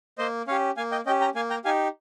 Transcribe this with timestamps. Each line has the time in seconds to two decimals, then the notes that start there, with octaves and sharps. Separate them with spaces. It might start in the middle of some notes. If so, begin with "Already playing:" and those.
0.18 A#3 C5 D#5
0.47 C#4 G4 C#5 F5
0.77 A#3 F5 G#5
0.92 D#5 G5
1.06 C#4 D#5 G5
1.09 G4
1.21 G5 A#5
1.35 A#3 F5 G#5
1.50 G5 A#5
1.65 D#4 G4 F5 G#5